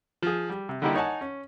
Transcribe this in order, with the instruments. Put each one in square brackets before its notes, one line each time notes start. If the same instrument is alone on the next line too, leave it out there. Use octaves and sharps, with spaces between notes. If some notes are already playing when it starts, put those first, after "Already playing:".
[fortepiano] F3 G#4
G3
C3
D3 G3 A#3 D#4 E4 G4
D#4 C#5 F#5 G#5 A5
C#4